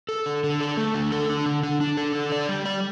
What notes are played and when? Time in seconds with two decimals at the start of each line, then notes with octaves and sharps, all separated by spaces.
0.09 A4
0.26 D3
0.44 D3
0.60 A4
0.77 A3
0.94 D3
1.12 A4
1.29 D4
1.46 D3
1.63 D4
1.81 D4
1.97 A4
2.15 D3
2.32 D5
2.49 G3
2.66 D5